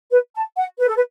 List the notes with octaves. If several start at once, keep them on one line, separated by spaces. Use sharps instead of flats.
B4
A5
F#5
B4
A4
B4